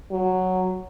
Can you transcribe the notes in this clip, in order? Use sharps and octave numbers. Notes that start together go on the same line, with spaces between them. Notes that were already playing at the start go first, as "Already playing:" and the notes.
F#3